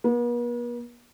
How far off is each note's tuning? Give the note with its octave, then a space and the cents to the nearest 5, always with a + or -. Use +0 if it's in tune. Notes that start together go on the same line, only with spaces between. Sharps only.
B3 -45